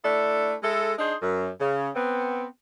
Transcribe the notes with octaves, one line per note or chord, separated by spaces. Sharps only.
A3 D4 E4 A4
G#3 E4 A4
D4 D#4 G#4 C5
F#2
C#3
B3 C4